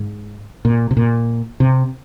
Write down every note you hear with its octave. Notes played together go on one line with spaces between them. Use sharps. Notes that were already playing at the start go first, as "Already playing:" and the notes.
Already playing: G#2
A#2
C3
A#2
C3